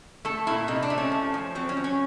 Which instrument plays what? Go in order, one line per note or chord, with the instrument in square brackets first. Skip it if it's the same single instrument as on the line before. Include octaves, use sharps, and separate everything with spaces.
[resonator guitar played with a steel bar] A3 A4
A#2 E4
C3 D#4
D4
A3
C#4
F3
F3
F#3 C4
C#4
F#3
C#4